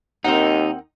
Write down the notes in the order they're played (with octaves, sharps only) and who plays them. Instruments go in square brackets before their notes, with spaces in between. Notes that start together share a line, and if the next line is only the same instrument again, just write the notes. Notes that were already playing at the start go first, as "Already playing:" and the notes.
[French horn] D#2 [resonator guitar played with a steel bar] C4 A#4 F#5 [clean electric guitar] D#4